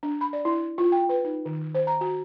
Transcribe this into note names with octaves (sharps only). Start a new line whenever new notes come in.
D4
B5
D5
E4
F4
G5
B4
D#4
D#3
C5
A#5
F#4